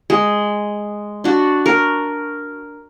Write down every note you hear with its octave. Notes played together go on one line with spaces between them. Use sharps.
G#3
D4 F#4
A#4